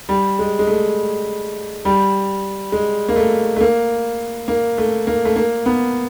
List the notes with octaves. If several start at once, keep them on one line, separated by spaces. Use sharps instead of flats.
G3
G#3
G#3
A3
G3
G#3
A#3
A3
A3
A#3
A#3
A3
A#3
A3
A#3
B3